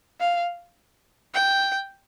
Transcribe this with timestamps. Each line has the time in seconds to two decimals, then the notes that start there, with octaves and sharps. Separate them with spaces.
0.20 F5
1.34 G5